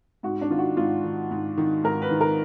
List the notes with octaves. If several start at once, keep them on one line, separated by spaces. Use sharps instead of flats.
G#2 F#4
D4
D#3 F4
F#4
G#2 F4
D#3
G#2
D#3
G#2 A#4
B4
D#3
A#4